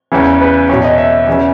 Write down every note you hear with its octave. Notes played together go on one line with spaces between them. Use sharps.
E2 C#3 E3
B4
E2 B2 C#5
D#5
E5
E2 C#3 E3